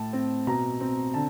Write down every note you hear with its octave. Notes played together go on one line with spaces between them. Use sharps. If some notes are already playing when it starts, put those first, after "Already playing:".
Already playing: A2 A5
C4
B2 A#5
C4
D3 A5